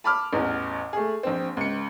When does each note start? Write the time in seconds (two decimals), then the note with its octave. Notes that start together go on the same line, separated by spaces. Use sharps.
0.04 A5 B5 D6 F6
0.33 A1 E2
0.93 A3 G#4
1.23 A#1 C4
1.57 C#2 C#7